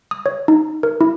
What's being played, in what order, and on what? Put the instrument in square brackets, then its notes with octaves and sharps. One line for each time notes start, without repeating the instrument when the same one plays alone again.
[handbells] D#6
C#5
D#4
A#4
E4